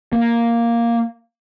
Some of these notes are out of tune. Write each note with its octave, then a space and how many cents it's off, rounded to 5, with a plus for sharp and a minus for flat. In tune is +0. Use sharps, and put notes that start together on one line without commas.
A#3 +0